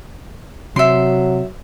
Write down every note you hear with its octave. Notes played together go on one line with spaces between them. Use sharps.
C3 F#3 E5 C6